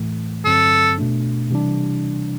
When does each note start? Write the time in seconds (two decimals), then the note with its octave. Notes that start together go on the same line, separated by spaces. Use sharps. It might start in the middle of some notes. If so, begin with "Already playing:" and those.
Already playing: A2 E3 A3
0.45 G2 D3 F#3 C4 A4
0.98 B2 A3 D4
1.50 C3 E3 G3 D4